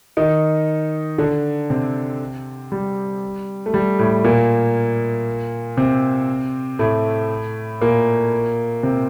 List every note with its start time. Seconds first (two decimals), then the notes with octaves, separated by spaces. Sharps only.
0.17 D#3 D#4
1.18 D3 D4
1.70 C3 C4
2.72 G3
3.66 A3
3.74 G3
3.99 A2 A3
4.24 A#2 A#3
5.77 C3 C4
6.79 A2 A3
7.81 A#2 A#3
8.83 C3 C4